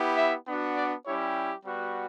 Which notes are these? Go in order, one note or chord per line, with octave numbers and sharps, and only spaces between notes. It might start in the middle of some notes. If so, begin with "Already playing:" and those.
Already playing: B3 E4 G4
E5
B3 D4 F#4
D5
G3 C#4 E4 G4 C#5
G3 B3 F#4